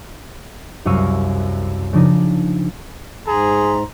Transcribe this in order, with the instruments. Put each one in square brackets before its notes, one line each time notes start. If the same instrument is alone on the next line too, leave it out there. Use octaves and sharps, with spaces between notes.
[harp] C2 F#2 F5 C#6 E6 D#7
C#3 F3 D4 D#4
[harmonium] G#2 [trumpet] G#4 [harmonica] A#5 C6